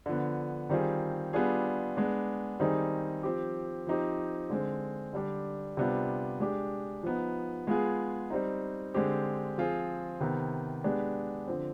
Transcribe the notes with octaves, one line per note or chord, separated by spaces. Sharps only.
D3 F3 B3
D#3 G3 C4 F4 G#4
G3 B3 D4 F4 G#4
G#3 B3 D4
D#3 G3 C4 D#4 G#4
F3 C4 G4
F3 C4 D#4 G4
D3 G#3 C4
D3 G3 D4 G4
C3 G3 B3 D4 F4
G#3 D4 G4
F3 B3 D#4
G#3 B3 F4 G#4
G3 C4 D#4
D3 G#3 C4 G4
F3 C4 F4 G#4
C3 D#3 B3
G#3 B3 D4 G4
D3 F3 C4